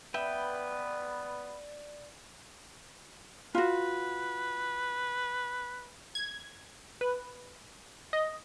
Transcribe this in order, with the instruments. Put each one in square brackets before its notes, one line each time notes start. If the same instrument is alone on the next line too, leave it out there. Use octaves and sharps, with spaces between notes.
[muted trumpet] B3 [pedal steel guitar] B4 G5 [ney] D5 [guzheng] E5
[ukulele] F4 F#4 [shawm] B4
[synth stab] G#6
B4
D#5